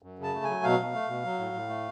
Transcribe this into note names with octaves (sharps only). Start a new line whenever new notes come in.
F#2
C#3 A5
A3
F#3 G#5
B2 F5
B2
A3
B2
F#3
A2
A2
A3